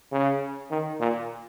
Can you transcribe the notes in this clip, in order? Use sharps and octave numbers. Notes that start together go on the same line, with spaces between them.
C#3
D#3
A#2